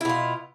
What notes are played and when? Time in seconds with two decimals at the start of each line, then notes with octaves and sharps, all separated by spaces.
0.01 E4
0.05 B2
0.09 F4